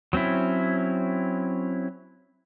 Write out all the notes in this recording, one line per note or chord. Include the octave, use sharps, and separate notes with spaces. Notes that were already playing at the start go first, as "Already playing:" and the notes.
F#3 C4 C#4 E4